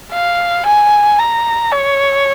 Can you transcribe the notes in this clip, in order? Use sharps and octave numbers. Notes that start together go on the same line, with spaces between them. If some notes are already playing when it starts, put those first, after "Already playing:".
F5
G#5
A#5
C#5